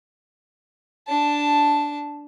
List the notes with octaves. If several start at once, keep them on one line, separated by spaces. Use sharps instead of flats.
D4 A5